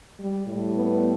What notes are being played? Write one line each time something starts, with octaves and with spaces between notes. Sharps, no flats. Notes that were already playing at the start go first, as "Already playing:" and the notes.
G3
A2 G3
B3